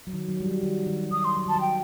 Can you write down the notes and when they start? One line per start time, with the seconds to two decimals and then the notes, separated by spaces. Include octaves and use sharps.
0.07 F#3
0.13 D#3
0.29 F#3
0.40 G3
0.46 F#3
0.63 D#3
0.87 D#3
1.11 D#3 D#6
1.25 C6
1.37 F#3
1.46 D#3 A5
1.56 F#3
1.61 G5